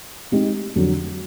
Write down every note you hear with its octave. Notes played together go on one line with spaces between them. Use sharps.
G#3 C4 D#4 G4
F2 D3 F#3